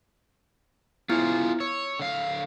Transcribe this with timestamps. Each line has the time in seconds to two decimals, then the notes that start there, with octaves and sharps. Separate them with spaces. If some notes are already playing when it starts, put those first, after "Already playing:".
1.09 B3 E4 F4 G#4 C5
1.60 C#5 E6
2.00 D3 F5